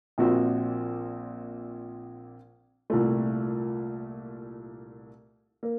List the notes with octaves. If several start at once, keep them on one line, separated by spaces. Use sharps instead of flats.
A#1 A#2 F3 C4 F#4
C2 A#2 A3
A#3